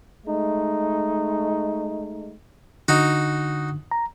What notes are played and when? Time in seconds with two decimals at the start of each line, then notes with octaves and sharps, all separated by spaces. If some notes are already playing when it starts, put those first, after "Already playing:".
0.25 G#3 A3 D#4
2.88 D3 D#4 F#4
3.91 A#5